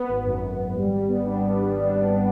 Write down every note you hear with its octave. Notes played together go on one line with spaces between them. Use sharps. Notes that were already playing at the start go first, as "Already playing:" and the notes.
Already playing: B3
G#1
F#2
G#1
G#1
G3
G3
B3
D4